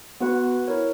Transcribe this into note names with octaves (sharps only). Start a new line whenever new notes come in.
B3 F#4 B4 F#5
E4 A#4 C#5